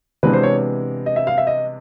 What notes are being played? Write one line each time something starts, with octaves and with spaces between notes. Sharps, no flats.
C3 E3 G#3 B3 D4 B4
C5
C#5
D#5
E5
F5
E5
D#5